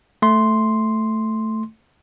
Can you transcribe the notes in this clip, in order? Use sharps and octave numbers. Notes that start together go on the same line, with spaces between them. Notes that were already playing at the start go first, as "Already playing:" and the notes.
A3 C6